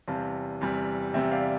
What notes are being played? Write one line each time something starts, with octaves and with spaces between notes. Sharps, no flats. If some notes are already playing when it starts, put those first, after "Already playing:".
E2 C3 G3 F5 A5
E2 C3 G3
E2 C3 G3 E5 G5
D5 F5